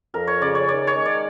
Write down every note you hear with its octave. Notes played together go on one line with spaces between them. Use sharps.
F2 A#4
C#5
C#3 D5
C#5
D#3 D5
C#5
G#3
D5